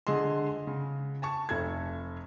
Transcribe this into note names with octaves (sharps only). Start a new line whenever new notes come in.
D3 G#4 D#5 C6
C#3
G#5 A5 C#6
F1 A4 G#6